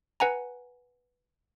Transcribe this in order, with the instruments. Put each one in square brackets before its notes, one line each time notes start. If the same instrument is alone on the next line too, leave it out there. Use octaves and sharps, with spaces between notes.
[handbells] B4 F#5 G#5 A#5